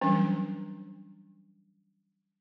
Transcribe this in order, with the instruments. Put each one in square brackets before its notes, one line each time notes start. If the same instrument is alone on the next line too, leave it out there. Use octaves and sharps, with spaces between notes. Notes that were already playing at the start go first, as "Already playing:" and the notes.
[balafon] E3 F#3 G3 C#4 D4